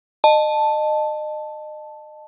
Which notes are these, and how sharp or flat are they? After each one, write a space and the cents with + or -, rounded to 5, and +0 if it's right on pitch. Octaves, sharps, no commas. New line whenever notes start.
D#5 -30 A5 +0